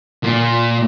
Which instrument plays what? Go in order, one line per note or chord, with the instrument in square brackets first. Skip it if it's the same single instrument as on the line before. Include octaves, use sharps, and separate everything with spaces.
[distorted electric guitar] A#2